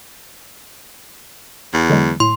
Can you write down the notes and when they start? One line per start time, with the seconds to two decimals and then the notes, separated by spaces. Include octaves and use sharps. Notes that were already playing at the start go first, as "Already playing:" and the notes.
1.74 E2
1.90 D3 F#3 G#3
2.20 A2 C6